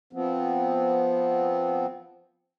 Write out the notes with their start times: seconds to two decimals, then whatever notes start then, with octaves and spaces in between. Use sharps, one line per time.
0.13 F3 B3 C4